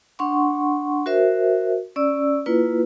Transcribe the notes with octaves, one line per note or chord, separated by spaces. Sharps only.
D4 F#5 C6 C#6
F#4 A#4 C5 E5
C#4 D5 E6
A#3 E4 F4 B4